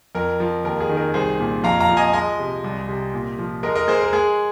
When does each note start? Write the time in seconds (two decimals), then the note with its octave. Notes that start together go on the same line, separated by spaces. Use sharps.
0.15 F2 A#4
0.40 F3
0.64 D#2 A#4
0.80 G#4
0.89 D#3
0.97 A#4
1.14 C2 G#4 C5
1.40 A#2
1.64 F2 F5 A#5
1.80 F5 A#5
1.89 F3
1.97 D#5 G#5
2.13 G#3 D#5 G#5
2.39 C3
2.64 C2
2.88 C3
3.14 A#2
3.39 F3
3.63 G#3 A#4 D#5
3.75 A#4 D#5
3.88 G#3 G#4 C5
4.01 A#4
4.13 G#3 G#4